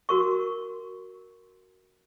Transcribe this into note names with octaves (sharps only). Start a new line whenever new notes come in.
F#4 A#4 C#6